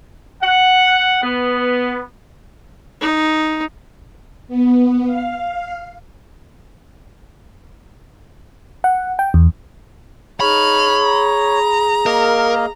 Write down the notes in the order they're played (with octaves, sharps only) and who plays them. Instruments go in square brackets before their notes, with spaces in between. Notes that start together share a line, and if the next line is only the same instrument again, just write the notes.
[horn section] F#5
B3
[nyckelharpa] D#4
[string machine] B3
F5
[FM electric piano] F#5
G5
E2
[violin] D#4 F6 [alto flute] G#4 [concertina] C#5 [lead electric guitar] B5
[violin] A#5
[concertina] A#3 D#5 F5 [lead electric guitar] A#4